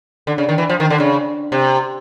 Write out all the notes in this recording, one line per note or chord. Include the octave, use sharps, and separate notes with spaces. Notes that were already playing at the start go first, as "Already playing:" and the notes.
D3
C#3
D#3
E3
F3
D#3
D3
C#3
C3